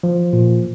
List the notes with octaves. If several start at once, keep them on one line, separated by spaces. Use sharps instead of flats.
F3
A#2